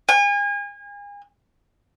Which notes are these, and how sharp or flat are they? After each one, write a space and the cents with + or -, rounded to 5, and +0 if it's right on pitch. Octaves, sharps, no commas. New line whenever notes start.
G#5 -35